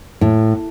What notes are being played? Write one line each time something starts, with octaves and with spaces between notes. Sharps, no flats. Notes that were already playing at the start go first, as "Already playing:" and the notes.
A2